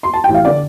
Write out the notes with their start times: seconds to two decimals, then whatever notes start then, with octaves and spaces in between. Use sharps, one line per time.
0.03 C6
0.13 A5
0.24 A1 G5
0.34 F5
0.45 D3 D5